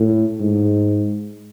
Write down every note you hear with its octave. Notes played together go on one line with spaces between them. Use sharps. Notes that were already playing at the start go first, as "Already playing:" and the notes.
Already playing: A2
G#2